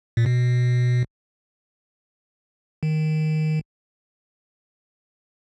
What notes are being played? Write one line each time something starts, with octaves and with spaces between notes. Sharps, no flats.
A#2
B2
D#3